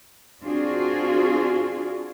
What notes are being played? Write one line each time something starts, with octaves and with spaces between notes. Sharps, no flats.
C4 D4 F4 F#4 G#4